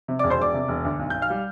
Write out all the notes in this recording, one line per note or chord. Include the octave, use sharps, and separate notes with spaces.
C3
E1 D5 D6
C5 C6
E1 D5 D6
C3
E1
D2
B1
B1 G6
F5 F6
G3